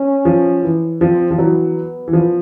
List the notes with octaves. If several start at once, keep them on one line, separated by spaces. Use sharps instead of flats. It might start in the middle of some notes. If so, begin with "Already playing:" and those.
Already playing: C#4
F3
E3
F3 C4
F3
E3 F#3 B3
E3
F3